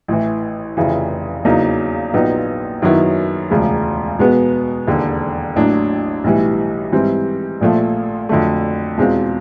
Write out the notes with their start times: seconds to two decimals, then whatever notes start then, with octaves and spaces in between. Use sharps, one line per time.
0.08 A1 A2 E3
0.77 F1 F2 C#3 E3
1.45 E2 C#3 F#3 A#3 D#4
2.13 A#1 A#2 F#3 B3 D#4
2.82 F#2 D#3 F#3 B3 E4
3.50 E1 D2 C#3 F3 G#3
4.19 B2 G#3 B3
4.87 E1 D#2 D3
5.56 A1 A2 F#3 A#3 D4
6.24 B1 A2 E3 G3
6.92 G#2 E3 G3 C4
7.61 A#1 A#2 F3 A3
8.29 F2 D3 F#3 A3
8.98 E2 B2 G#3 C4 F4